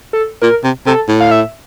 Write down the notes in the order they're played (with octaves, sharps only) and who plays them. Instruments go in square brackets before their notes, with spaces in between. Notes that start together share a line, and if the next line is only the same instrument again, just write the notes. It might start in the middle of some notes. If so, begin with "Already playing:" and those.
[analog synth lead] A4
[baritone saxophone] A#2 [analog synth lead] A#4
[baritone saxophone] C3
[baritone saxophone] C3 [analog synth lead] A4
[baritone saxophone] A2
[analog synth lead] F5
E5